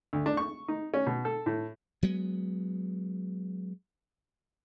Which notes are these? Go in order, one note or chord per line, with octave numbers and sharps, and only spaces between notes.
D2
D4
C#6
D#4
C#4
B2
A4
A2
F#3 G#3 B3